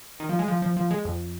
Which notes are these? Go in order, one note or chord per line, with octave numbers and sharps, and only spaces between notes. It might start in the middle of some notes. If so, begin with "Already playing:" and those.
D#3
F3
G#3
F3
F3
F3
G#3
F2